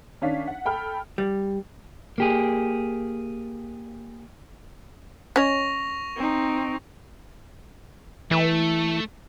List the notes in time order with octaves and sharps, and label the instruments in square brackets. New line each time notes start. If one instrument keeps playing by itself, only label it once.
[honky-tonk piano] D#3 C#4 D4 F5 B6
F#5
A4 G5 B5 F6
[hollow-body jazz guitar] G3
[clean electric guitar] A#3 G4 G#4
[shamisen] C#4 C#5 D#5 [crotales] C#6 A#6 F7
[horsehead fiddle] C4 D#4
[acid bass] E3 [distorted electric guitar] A3